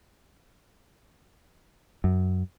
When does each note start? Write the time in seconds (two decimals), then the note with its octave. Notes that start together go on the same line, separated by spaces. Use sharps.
2.04 F#2